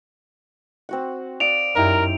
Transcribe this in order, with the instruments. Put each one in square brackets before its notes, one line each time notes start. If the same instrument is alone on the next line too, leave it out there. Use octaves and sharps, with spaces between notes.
[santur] C4 F#4 F#5
[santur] D5 F5 D#6 [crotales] D7 F7
[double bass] F#2 [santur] D#4 E4 G4 [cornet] A#4